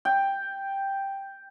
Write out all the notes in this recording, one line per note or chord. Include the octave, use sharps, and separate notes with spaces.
G5